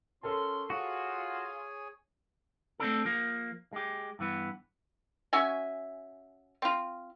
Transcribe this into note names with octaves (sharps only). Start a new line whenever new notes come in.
F3 C#4 A4 A#4 A5 C6
F4 F#4 G#4 C#5 G#5
A3 C4 D4 A4
F3 A#3
G#3 G4
G2 E3 B3
C#4 F#4 E5 G#5
C4 F4